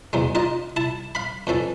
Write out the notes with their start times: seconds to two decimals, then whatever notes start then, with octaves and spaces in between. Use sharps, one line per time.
0.13 E2 F#3 G#3
0.35 D#4 F4 D#5
0.76 E4 A5
1.15 F5 B5
1.47 F2 E3 C#4 A4